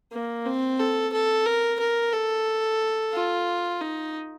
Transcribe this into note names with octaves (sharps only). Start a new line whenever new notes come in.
A#3
C4
A4
A4
A#4
A#4
A4
F4
D#4